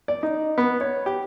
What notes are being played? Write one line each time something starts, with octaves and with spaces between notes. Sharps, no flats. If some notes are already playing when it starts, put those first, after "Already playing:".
D5
D#4
B3
C#5
G4